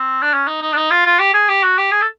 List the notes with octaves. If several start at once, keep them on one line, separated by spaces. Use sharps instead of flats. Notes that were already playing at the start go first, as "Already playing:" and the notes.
Already playing: C4
D4
C#4
D#4
D#4
D4
D#4
F4
F4
G4
G#4
G4
F#4
G4
G#4
A4